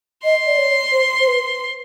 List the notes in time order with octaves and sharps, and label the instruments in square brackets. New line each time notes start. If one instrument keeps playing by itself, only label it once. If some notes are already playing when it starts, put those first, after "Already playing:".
[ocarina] D#5 [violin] C6
[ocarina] D5
C#5
C5
C5
B4